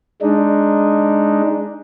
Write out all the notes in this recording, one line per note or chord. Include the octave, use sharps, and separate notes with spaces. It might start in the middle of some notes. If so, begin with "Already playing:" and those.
G#3 D4 D#4